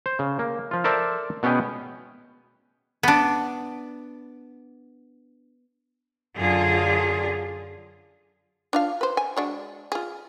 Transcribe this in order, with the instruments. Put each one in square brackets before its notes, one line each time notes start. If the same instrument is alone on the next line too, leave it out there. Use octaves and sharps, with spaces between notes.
[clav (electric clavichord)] C5
C#3
A#3
F3 F4
A4 A#4 C5 D5 E5 A5
B2 B3 C#4 G#4 G5
[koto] B3 D4
[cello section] F#2 D3 F4 G#4
[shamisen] D4 F4 F5
B4 C5
G#5
G#3 D4 F#4
F4 G#4